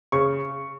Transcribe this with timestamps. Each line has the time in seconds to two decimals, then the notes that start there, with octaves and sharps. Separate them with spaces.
0.12 C#3 C#6